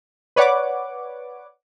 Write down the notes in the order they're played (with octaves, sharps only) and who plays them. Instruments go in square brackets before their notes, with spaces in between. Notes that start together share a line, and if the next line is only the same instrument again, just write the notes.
[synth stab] B4 C#5 D5 F#5 D6